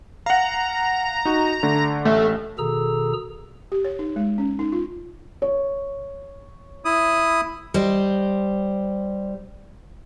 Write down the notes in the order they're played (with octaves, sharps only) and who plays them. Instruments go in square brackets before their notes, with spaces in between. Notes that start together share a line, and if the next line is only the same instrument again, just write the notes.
[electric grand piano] F5 F#5 [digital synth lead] A#5
[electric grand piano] D#4 F#4
D3 A3 D4
[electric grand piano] A1 E5 [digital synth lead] A3
[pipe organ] B2 D#3 G#4 A4 A#5 E6
[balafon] G4
C#5
D#4
G#3
C#4
D#4
F4
[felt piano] C#5
[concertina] E4 D#6
[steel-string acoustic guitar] G3 C5 D#5